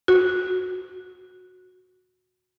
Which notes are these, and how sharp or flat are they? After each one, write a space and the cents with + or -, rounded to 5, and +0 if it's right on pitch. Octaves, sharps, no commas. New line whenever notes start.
F#4 -15